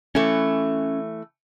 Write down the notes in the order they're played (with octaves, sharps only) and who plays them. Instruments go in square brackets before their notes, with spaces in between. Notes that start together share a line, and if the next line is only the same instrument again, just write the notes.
[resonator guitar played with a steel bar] E3 A3 [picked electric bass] C#4